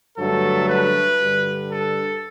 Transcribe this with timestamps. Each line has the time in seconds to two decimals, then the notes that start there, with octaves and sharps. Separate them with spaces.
0.18 G2 D3 F#3 A3 A4
0.69 B4
1.20 G2 D3 G3
1.72 A4